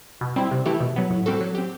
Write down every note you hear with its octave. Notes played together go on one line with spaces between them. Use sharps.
B2
G3 C4 E4
C3
E3 A3 E4 G4
B2
F#3 B3
A2
G3 C4 F#4 A4
F#3
C4 G4